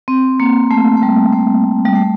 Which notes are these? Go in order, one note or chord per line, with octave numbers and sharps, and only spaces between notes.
C4
A#3
A3
A3
G3
A3
G3
A3